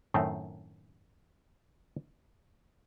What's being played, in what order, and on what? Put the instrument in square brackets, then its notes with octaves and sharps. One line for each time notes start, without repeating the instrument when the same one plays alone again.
[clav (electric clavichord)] F#2 A2 D#3 A3 C4